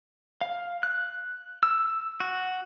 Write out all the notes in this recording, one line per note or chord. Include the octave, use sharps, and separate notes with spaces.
F5
F#6
E6
F#4